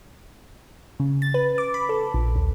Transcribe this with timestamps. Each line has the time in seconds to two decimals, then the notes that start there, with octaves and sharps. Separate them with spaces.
1.00 C#3
1.22 A6
1.34 B4
1.58 D6
1.74 B5
1.89 A4
2.14 A#1
2.36 D#2